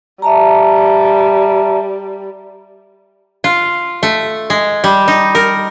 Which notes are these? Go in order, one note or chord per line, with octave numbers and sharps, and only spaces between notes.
G3 E5 A5 A#5
F4
A3
G#3
G3
D#4
A#4